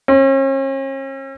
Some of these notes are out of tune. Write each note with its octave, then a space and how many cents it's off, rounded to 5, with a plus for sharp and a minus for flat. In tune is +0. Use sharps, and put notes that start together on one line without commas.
C#4 -40